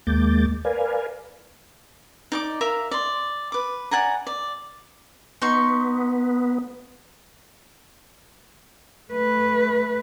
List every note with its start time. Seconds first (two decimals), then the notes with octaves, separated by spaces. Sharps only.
0.07 D#2 G#3 A#3 D6 G6 A6
0.65 A#4 B4 D5 F5 G#5
2.32 D#4 D5 D6
2.61 A#4 E5 F5
2.91 D5 C6
3.52 B4 D6
3.91 D5 F#5 G#5 A#5
4.27 D5
5.42 B3 D#4 C6 C#6
9.12 A3 B4